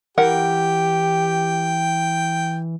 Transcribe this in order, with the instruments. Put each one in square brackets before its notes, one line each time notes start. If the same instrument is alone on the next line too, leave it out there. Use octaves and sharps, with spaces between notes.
[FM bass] E3 [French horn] G4 [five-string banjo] A#4 F#5 [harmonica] G5